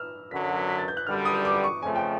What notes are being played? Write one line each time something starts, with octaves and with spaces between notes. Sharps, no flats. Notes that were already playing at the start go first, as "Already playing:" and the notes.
Already playing: E6 F6
F#2 D3 F#3 B6
B6
B6
B6
A6
G6
F#6
F#2 D3 G3 F6
D#6
D6
C#6
F2 C#3 F3 A3 G#5
G5